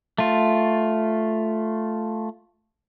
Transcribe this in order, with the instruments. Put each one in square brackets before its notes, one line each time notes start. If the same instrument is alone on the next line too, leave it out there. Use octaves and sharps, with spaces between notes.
[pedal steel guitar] A3 F4